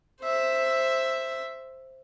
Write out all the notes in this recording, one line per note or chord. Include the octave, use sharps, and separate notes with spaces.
C5 E5